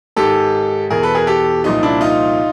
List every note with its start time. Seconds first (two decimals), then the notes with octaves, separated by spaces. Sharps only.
0.17 G#2 D#3 G4 A4
0.90 E2 B2 G#4 A#4
1.03 A4 B4
1.15 G#4 A#4
1.27 G4 A4
1.64 C2 A#2 F3 D#4
1.83 D4 E4
2.01 D#4 F4